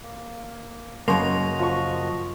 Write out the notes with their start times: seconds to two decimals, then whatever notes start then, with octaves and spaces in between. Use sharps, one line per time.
0.03 A#3
1.08 F#2 C#3 F#3 A#3 F#4 D#5 C6 F7
1.59 F3 C#6